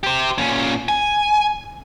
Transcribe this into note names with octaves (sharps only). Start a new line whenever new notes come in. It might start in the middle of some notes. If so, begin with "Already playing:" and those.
G4 C5
A#2 C#4
G#5